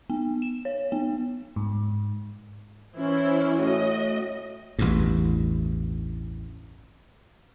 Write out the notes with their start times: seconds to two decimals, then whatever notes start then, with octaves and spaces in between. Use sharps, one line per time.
0.10 B3
0.42 E7
0.65 C#5
0.92 B3
1.56 G#2
2.97 E3 C#4 E4 C5
3.59 A2 F#4 D#5
4.79 A1 E2 G2